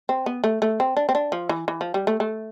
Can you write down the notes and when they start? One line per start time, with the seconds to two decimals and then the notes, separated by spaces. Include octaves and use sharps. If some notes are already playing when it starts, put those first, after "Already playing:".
0.09 C4
0.26 B3
0.44 A3
0.62 A3
0.80 C4
0.97 D4
1.09 C4
1.15 D4
1.32 F3
1.49 E3
1.68 E3
1.81 F3
1.94 G3
2.07 A3
2.20 A3